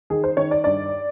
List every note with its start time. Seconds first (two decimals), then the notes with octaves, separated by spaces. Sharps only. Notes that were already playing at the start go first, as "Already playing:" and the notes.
0.10 D#3 G#4
0.24 C5
0.37 D#3 C#5
0.51 D5
0.64 G2 D5